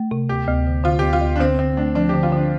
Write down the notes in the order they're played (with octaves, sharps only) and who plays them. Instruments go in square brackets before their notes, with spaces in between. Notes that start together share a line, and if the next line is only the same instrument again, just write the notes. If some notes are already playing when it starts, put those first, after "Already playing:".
Already playing: [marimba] A3
C3
[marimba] D2 [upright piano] G4
[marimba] D2
D3
[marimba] D3 [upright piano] F4
[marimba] D2 [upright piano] G4
[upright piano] F4
[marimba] D2
[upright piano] D4
[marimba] D3 [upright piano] C4
[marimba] D3 [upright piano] C4
[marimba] A3 [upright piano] D4
[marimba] F3 [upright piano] D4
[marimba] D3 [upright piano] G4
[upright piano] F4
[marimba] D3 [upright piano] D4